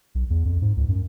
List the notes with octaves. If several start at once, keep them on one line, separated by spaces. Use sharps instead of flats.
B1
E2
F2
G#2
C#2
F#2